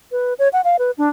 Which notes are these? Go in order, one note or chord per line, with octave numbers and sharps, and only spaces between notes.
B4
C#5
F#5
F5
B4
D4